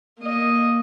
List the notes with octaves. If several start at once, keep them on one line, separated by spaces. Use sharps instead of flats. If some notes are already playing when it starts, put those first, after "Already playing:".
A#3 D#5